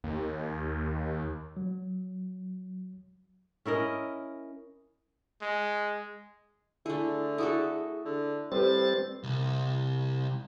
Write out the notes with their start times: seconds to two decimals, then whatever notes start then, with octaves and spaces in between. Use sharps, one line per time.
0.04 D#2
1.57 F#3
3.66 C#4 E4 A#4 D#5
5.42 G#3
6.86 D3 A3 E4 G#4
7.38 E4 F#4 G#4 A4 D#6
8.05 D3
8.52 A2 G3 C4 G4 B4 C5 A6
9.24 C2